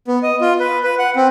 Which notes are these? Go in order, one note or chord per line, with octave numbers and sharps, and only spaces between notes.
B3
D#5
F4
B4
B4
F#5
C4